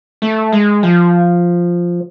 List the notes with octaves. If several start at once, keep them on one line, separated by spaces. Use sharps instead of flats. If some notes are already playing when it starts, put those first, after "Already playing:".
A3
G#3
F3